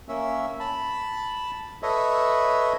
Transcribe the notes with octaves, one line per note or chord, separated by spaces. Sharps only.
A#3 C#4 E5
A5 B5
A4 B4 C#5 D#5 E5